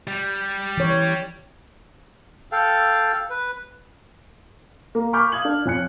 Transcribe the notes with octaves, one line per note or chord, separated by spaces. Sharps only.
G3
E3 C#5
A4 F5 G5
B4
A#3
G#5 B5 C#6 D6 F6 G6
F5 D#6 G#6 F#7
D4
F2 C#5 G#5 F#6 C#7